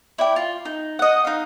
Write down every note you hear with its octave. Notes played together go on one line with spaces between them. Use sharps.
E4 D5 G5
F4
D#4
D#5 F#5
D#4 F5